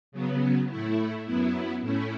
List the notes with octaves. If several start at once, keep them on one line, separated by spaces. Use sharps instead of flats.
C#3 F#3 B3
A2 A3 E4
F#2 F#3 B3 E4
A2 A3 C#4 E4